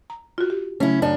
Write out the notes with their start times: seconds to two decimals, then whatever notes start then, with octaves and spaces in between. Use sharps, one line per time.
0.10 A#5
0.38 F4 F#4
0.50 G4
0.80 C#3 F#3 A3 C#4 E4
1.02 F#2 D4 A5